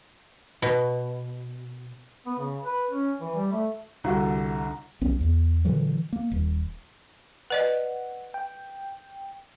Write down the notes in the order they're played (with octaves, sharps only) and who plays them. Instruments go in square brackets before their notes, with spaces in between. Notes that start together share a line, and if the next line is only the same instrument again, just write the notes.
[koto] B2
[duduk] B3
C#3
B4
C#4
E3
G3
A3
[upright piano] C2 D3 F#4
[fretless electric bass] B1 B3 C#4
E2
A#2 D3 E3 F#3
A#3
D#1
[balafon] B4 D5 D#5 [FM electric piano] F#5
[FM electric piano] G5